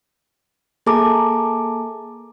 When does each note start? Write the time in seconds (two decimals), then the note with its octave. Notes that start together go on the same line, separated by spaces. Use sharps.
0.86 A#3 G#4 A4 A5 A#5 D6